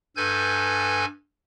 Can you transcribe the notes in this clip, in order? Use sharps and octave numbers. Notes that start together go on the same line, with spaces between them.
G2 A4 B4 G#5 G6 G#6